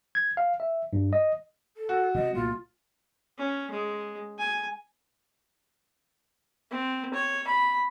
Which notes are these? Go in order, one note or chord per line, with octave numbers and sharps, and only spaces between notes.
G#6
F5
E5
G2
D#5
A4
F#4
C3 G3 G#3 D#5
C2 A#2 A3 F4
C#4
G#3
G#5
C4
C#5
B5